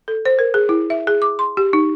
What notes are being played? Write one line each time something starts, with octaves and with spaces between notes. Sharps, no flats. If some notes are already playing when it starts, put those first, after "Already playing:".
A4
C5
A#4
G#4
E4
E5
G#4
D6
C6
G4
D#4